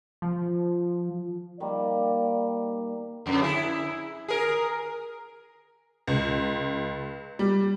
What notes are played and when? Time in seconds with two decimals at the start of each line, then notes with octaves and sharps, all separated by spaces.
0.22 F3
1.60 D#3 G3 A#3 D5
3.26 F2 D3
3.42 E4 G#4
4.28 G#4 A#4
6.07 C#2
7.39 G3